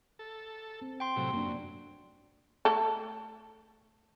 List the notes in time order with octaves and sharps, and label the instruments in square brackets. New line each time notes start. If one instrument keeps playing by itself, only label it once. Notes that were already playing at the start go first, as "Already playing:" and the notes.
[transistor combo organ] A4
[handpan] C4
[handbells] G5 C6
[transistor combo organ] A2 C3 F#3
[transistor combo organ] F#2 [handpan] A#3 D4
[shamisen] A3 A4